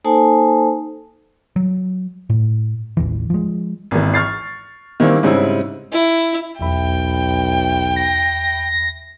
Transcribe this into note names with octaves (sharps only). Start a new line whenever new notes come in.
A#3 D#4 A4 C5 G#5 A5
F#3
A2
A1 D#2 E3
F3 G#3
G#1 E3
C#6 F6 A6 C7
D#3 E3 G3 A#3 C4
G#2 C#3 G3 C4 E4
E4
B1 E2 E5 G5 B5
A#6